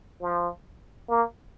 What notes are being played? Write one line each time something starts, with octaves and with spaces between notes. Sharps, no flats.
F3
A#3